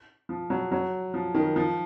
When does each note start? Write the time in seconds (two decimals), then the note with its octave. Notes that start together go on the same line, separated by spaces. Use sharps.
0.29 F3
0.50 F#3
0.72 F#3
1.14 F3
1.34 D#3
1.56 F3